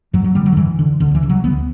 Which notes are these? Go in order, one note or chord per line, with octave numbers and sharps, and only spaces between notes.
F#2 F#3
F#3
D3 G3
F#3
D3
F#2 E3
D3
D2 D3
E3
C#3
F#3
D2 B3